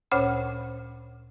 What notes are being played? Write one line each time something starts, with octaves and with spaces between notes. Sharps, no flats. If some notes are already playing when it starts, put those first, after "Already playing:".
D2 A#2 C#4 C5 C#5 B5